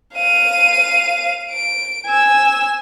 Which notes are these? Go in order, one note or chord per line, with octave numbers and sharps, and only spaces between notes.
F5 D#7
D7
G#5 E6